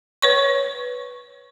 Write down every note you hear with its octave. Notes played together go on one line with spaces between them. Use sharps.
B4 C#5 C#6